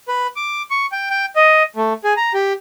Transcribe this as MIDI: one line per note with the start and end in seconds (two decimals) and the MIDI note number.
0.08 0.27 71
0.36 0.62 86
0.70 0.86 85
0.92 1.10 79
1.10 1.26 79
1.36 1.63 75
1.76 1.93 57
2.04 2.13 68
2.17 2.33 82
2.34 2.53 67